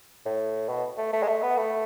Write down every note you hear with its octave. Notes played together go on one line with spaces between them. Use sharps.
A2
B2
A3
A3
G#3
A3
B3
A3